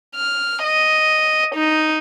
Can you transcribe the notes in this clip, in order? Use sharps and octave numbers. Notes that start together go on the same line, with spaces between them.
F6
D#5
D#4